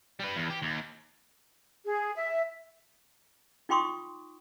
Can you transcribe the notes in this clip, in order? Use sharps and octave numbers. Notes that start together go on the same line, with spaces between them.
G3 B4
E2
G4
D#2
G#4
E5
D#4 F4 G5 C6 C#6 D#6